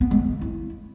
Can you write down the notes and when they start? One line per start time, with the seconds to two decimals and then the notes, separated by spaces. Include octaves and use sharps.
0.01 B3
0.11 G#3
0.21 G#3
0.31 A#3
0.41 E4